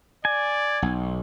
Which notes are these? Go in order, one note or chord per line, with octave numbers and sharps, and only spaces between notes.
D5 G#5
B1